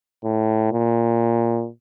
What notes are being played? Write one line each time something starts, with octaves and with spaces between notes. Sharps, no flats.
A2
A#2